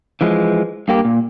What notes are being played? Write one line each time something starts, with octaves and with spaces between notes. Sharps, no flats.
E3 F3 G#3
G2 A#3 G4
A#2